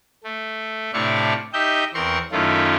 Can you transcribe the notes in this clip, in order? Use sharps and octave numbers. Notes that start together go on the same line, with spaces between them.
A3
A2 C3 D4 E4 F5 C#6
D#4 G4 D#5 E5 G6
E2 C4 A#4 C6 C#6
F#2 D#3 A3 C#4 E4 F4